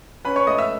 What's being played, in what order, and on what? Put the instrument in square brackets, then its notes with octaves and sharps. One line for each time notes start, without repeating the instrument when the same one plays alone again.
[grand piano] C#4 B4 B5
C#5 C#6
A3 D#5 D#6
E5 E6